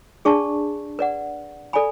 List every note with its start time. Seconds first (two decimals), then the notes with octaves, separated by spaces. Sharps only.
0.25 D4 G#4 D5 A5 C#6
0.99 B4 D5 F#5
1.73 A4 D5 G#5 B5